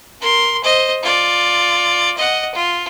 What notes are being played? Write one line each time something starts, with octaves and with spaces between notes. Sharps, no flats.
A#4 C6
C5 D#5
F4 D5
D#5 F#5
F4